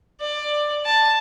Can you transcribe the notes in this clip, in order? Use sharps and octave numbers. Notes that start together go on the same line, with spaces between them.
D5
A5